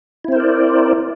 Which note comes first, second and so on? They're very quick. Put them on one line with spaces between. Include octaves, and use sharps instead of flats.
E4 C4 C5 A#4 D5